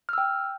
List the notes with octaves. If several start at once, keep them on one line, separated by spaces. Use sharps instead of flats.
G5 E6 F6